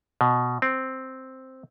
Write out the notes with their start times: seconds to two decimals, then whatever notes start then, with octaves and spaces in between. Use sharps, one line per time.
0.21 B2
0.62 C4